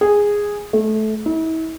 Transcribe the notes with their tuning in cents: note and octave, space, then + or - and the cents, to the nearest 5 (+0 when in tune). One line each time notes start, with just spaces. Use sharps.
G#4 -10
A3 -20
E4 -40